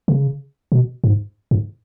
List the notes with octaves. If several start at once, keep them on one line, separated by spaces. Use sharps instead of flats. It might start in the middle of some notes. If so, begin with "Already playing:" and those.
C#3
B2
G#2
G#2